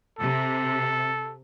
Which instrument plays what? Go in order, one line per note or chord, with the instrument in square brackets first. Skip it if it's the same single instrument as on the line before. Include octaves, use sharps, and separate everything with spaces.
[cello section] C3 [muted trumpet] A4